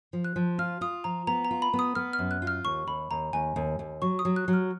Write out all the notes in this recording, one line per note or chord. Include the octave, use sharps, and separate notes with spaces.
F3
F#6
F3
F4 F6
F4 D#6
F3 A#5
B3 A#5
A#5
F4
B5
B3
D#6
B3 F6
F6
F#2
F#6
F4
F6
D#2 C#6
D#2 B5
D#2 A#5
D#2 G#5
D#2
D#2
F#3 C#6
D#6
F#3
F#6
F#3
F6